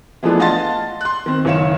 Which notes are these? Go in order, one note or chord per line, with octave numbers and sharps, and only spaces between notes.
E3 F3 G#3 A3 B3 D4
D#5 F5 F#5 A5 C6 A6
C6 F#6
D#3 C4
F#1 D#3 C#5 F5 E7